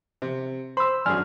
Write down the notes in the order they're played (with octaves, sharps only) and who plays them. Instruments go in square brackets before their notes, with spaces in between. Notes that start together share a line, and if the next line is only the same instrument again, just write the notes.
[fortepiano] C3
[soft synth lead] C5 [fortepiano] B5 [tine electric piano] C6 E6
[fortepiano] G#1 F#2 G#4 [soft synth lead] D4 [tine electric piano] G#5 F6